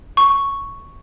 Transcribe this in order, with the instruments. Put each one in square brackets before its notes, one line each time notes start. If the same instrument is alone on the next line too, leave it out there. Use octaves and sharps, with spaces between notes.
[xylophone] C#6